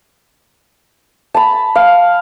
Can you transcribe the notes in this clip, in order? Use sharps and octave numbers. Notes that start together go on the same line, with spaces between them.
A5 B5
F5